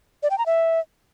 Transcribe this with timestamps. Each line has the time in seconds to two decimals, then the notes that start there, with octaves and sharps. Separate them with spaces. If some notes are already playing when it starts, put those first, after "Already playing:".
0.23 D5
0.31 G5
0.38 A#5
0.46 E5